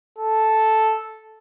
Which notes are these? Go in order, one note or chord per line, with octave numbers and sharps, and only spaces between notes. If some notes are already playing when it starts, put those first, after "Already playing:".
A4